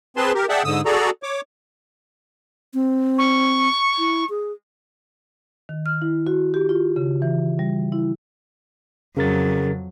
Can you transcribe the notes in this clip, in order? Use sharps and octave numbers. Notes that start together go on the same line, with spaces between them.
C4 G#4 B4 A5 C6
G4 A#4
G#4 D5 E5 F#5 G5 A5
G#2 D3 D#6 E6
F#4 G#4 A4 D5 A#5
C#5 D6
C4
C#6
E4
G#4
D#3
F6
E4
F#4
G4
F4
C#3
E3
G3
E4
F2 C#3 F#3 A#4 A6